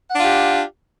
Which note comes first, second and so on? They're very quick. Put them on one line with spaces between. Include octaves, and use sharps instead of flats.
F#5 D4 F4 G4